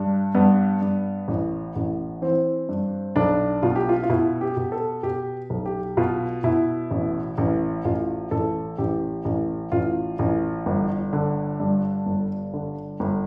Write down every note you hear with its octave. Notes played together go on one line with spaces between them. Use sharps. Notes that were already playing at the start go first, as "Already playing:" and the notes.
Already playing: G2
G2 B3
G2
A1
A1
E3 C4
G2
B1 D4
B2 F4
G4
F4
F4
B2 E4
G4
B2
A4
B2 G4
B1
G4
B2 F4
B2 E4
A1
A1
A1 F4
A1 A4
A1 G4
A1
A1 F4
A1
G1
D3
G2
G1
D3
G1